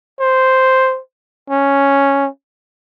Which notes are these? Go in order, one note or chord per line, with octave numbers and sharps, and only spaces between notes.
C5
C#4